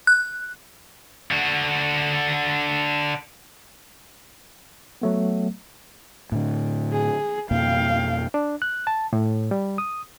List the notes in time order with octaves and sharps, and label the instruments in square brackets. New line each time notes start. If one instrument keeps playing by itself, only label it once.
[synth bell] F#6
[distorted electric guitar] D3 F#4
[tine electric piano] F#3 A3 B3
[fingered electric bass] A2 D3
[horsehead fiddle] G#4
[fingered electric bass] F2 B2 A#3 [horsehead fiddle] F5 G5
[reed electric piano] D4
F#6
A5
A2
G3
D#6